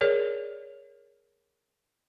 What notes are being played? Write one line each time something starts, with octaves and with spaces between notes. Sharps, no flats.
G#4 A#4 C#5 D5